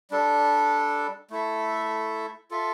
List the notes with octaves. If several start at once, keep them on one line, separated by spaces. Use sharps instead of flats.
G3 D4 A4
A3 E4 A4 E5
F4 A4 E5